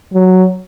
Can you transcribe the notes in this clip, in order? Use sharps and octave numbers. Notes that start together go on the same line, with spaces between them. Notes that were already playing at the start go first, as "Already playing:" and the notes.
F#3